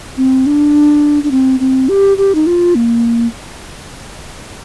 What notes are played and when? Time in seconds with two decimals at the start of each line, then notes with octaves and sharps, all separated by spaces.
0.17 C4
0.46 D4
1.24 D4
1.31 C4
1.60 C4
1.89 G4
2.18 G4
2.35 D#4
2.46 F4
2.75 A#3